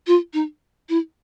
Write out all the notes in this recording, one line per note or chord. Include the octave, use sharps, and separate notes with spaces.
F4
D#4
E4